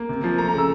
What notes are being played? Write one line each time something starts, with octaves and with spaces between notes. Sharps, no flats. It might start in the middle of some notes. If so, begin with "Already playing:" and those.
Already playing: A#3
C3
F3
A3 A#5
A#5
C#3 E6